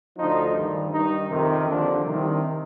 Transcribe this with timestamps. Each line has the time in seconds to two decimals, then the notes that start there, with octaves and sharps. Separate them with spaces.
0.17 D2 D3 F3 D#4
0.55 G2 D#3
0.92 G2 D#3 D#4
1.29 F2 C3 D#3
1.67 D#2 D3 F3 D4
2.03 C2 C3 D#3